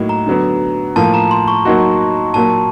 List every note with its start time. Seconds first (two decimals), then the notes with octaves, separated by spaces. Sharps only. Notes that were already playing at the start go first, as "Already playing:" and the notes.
Already playing: A2 F#3 A#3 D#4
0.09 A#5
0.26 D3 F#3 B3
0.96 A2 F3 A#3 A5
1.14 A#5
1.31 C6
1.48 C#6
1.65 F#3 A#3 D#4 F#4
2.34 A#2 F#3 A#3 A5